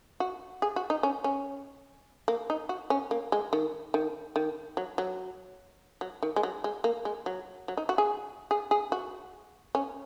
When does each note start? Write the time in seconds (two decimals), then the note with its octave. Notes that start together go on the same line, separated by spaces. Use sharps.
0.20 F#4
0.62 G#4
0.76 F#4
0.90 D#4
1.03 C#4
1.24 C#4
2.28 A#3
2.50 D#4
2.69 F#4
2.90 C#4
3.11 A#3
3.32 G#3
3.53 D#3
3.94 D#3
4.36 D#3
4.77 F#3
4.98 F#3
6.01 F#3
6.23 D#3
6.36 G#3
6.43 F#3
6.64 G#3
6.84 A#3
7.05 G#3
7.26 F#3
7.68 F#3
7.77 D#4
7.89 F#4
7.98 G#4
8.51 G#4
8.71 G#4
8.92 F#4
9.75 C#4